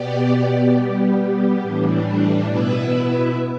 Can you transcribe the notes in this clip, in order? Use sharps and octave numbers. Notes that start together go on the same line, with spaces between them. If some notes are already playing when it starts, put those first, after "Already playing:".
Already playing: B2 B3 G4 D5
G3 B3 G4
A2 E3 G3 D4
B2 B3 E4 B4 E5